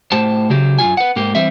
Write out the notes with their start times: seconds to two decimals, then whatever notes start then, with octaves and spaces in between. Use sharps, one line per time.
0.12 A2 G4 C5 A5
0.50 C#3 F#3 G4
0.79 F#2 C#3 F4 G#5
0.97 B4 F#5
1.16 G#2 A#3 G4
1.35 E3 G3 C4 E5